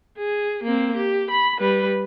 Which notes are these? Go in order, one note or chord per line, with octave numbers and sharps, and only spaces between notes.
G#4
A#3 C4
G4
B5
G3 B4